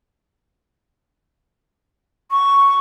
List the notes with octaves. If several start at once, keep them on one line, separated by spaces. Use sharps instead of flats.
C#6